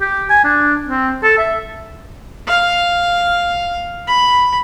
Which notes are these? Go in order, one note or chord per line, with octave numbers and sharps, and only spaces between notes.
G4
G#5
D4
C4
A4
E5
F5
B5